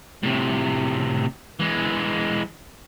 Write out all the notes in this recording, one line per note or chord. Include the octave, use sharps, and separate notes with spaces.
A2 C3
E3 G#3